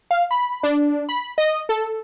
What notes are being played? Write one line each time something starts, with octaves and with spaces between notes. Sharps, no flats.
F5
B5
D4
B5
D#5
A4